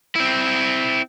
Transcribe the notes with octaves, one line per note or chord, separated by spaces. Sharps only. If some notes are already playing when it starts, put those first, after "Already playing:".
C4 E4